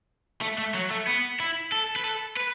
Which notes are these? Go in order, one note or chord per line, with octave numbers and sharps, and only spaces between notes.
A3
A3
F#3
A3
B3
E4
A4
B4
A4
B4